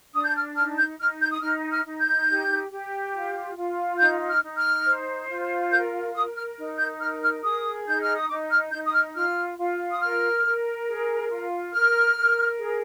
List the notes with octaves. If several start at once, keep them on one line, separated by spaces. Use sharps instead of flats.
D4 D#6
G6
F6
D#4 F6
G6
D#4 F6
G6
D#6
D#4 F6
F6
D#4
G6
G4
G4
F4
F4
D#4 G6
F6
D#4
F6
C5
F4
A#4 G6
A#4 D#6
F6
D#4
G6
A#4 F6
F6
G#4 D#6
D#4 G6
F6
D#6
D#4 D6
F6
D#4 G6
D#6
F6
F4 F6
F4
D#6
A#4 F6
A#4
G#4
F4
A#4 F6
A#4
G#4